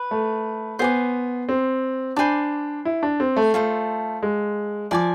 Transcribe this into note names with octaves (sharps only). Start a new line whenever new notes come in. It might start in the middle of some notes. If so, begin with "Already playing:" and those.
Already playing: B4
A3
B3 C5 G#5 D6
C4
D4 C5 G#5 B5 D6
E4
D4
C4
A3
A3 F4 A4 C5
G#3
F3 D5 G#5 D6